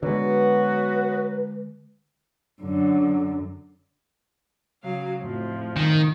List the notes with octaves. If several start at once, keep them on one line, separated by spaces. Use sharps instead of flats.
D3 F#3 G#3 B3 F#4 B4
F#2 D3
C#3 F#3 F5
F2 A2 F3
D#3